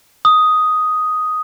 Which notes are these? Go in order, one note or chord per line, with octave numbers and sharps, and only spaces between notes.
D#6